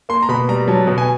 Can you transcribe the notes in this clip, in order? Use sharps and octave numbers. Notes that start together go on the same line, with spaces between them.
A#3 C6
A#5
B2 B5
G3 A#5
F#3 A5
B2
G#5